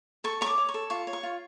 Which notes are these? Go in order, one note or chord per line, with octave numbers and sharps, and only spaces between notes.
A4 C#6
C#5 C#6
D6
C#5
C#6
A4
F4 C#6
C#5
C#6
F4